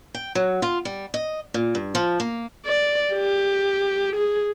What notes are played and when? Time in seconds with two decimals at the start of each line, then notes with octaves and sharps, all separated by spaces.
0.14 G5
0.35 F#3
0.62 F4
0.85 G3
1.14 D#5
1.54 A#2
1.75 G2
1.95 F3
2.20 A#3
2.66 D5
3.14 G4
4.16 G#4